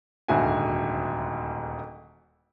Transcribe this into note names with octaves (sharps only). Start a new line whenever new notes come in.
D#1 D2 G#2 F#4 E5 G#5